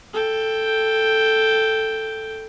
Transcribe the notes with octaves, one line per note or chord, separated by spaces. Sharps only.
A4 G5